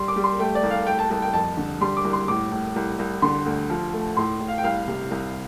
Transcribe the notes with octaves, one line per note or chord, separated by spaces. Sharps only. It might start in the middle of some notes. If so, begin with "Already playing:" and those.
Already playing: G3 C6
D6
G3
C6
A3 G5
D5
C2
F5
A3 G5
A5
C2 A5
G5
F2 A5
D3
G3 C6
D6
C2
C6
A2 D6
A2
C2
C2
D3 C6
D2
F3
A3
A2 C6
A2
F5
G5
C2 F5
C3
C2